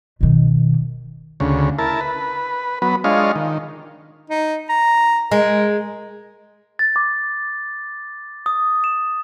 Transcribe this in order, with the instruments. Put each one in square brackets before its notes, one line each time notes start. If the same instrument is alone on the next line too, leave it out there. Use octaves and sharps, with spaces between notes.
[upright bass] B2 D#3
[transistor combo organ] D2 C#3
E4 A#4 A5
B4
F#3 B3 B4
G#3 D4 F4 C#5 D#5 F5
D#3
[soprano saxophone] D#4
A#5
[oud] G#3 [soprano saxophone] A#4
[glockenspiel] A6
D6
D#6
E7